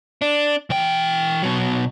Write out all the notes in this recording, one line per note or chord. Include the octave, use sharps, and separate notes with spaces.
D4
E3 G5
B2 F#3